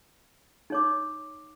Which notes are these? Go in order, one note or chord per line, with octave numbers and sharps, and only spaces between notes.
D#4 C#5 D6